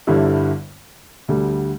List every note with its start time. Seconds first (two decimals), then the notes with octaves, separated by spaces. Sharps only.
0.07 G1 G2 D3 G3 E4
1.28 D2 D3 G3